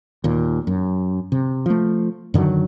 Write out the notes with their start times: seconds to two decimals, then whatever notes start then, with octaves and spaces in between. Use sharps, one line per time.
0.24 D#2 A#2
0.67 F#2
1.32 C3
1.66 F3 A3
2.34 F#2 D3 D#3 F#3